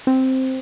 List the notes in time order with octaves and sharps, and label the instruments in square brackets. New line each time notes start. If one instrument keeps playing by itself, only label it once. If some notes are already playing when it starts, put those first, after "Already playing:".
[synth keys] C4